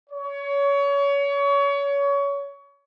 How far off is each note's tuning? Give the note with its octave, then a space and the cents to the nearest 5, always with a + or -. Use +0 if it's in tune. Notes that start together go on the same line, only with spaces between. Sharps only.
C#5 +25